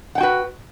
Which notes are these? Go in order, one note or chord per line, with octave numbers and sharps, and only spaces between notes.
F#4 B4 F#5 G5